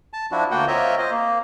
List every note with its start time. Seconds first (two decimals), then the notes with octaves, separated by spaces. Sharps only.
0.13 A5
0.32 F3 D4 E4 F#4
0.51 D2 A#3 F#4 F#5 G5
0.68 C4 F4 A#4 C#5 D#5 E5
0.98 C5 D#5
1.11 A#3